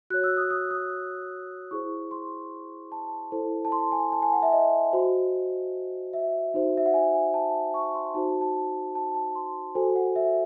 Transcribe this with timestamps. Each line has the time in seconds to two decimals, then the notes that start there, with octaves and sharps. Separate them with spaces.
0.10 F#4 C#5 F#6
0.24 E6
0.37 D#6
0.51 D#6
0.71 D#6
1.71 E4 G#4 C5 C#6
2.11 C6
2.92 A5
3.32 E4 A4 C5
3.65 A5
3.72 C6
3.92 G#5
4.12 A5
4.22 G#5
4.33 F#5
4.43 E5
4.53 D#5
4.93 F#4 C5
6.13 E5
6.54 D#4 F#4 C5
6.77 E5
6.86 F#5
6.94 G#5
7.14 G#5
7.34 A5
7.74 C#6
7.95 C6
8.14 D#4 F#4 C5 A5
8.41 A5
8.95 A5
9.15 A5
9.35 C6
9.75 F#4 A4 C5 G#5
9.96 F#5
10.16 E5